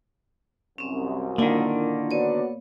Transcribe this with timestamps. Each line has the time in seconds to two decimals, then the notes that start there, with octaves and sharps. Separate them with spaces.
0.78 C2 F#2 C4 C#4
1.38 D3 D#3 A#3 D4 E4 F4
2.11 B3 F#4 B4 C#5 D5